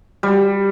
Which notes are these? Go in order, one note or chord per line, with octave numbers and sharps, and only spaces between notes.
G3